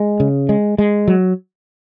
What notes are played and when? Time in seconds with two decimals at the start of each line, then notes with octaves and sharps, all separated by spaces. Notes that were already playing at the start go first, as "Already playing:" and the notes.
Already playing: G#3
0.20 C#3
0.49 G#3
0.78 G#3
1.08 F#3